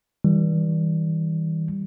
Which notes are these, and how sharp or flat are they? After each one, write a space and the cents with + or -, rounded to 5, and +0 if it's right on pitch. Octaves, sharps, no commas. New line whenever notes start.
E3 -40 G3 +0